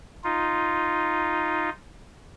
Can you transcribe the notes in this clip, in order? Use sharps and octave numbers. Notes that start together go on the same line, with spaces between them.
D#4 F4